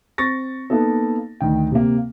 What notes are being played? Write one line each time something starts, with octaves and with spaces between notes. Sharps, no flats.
C4 C#6 A6 A#6
A#3 B3 D#4 A4
D2 D#3 G5
C3 A#3